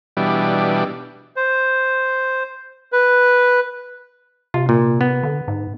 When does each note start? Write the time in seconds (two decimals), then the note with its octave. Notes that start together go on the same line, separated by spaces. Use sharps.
0.17 B2 E3 G3 D4
1.36 C5
2.92 B4
4.54 C3 F4
4.69 A#2
5.01 B3
5.23 D3
5.48 G#2